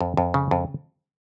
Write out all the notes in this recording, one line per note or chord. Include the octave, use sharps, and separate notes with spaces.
F2
F2
C#3
F2